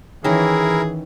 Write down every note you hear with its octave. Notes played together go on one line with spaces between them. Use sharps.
D#3 E3 C#4 E4 G#4 A#4